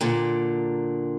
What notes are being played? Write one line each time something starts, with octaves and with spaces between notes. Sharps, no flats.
A#2 D3